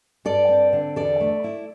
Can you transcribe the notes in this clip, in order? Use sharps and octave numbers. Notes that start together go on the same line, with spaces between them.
G2 A4 D5
C4
D3
E2 A4 D5
A3
E4